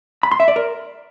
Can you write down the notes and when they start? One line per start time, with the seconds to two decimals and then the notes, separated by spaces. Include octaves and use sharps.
0.23 B5
0.31 C6
0.40 E5
0.48 D5
0.56 A#4